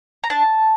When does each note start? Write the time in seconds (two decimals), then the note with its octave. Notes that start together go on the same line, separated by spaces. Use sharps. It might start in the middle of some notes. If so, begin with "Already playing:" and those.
0.24 A#5
0.30 D4 A5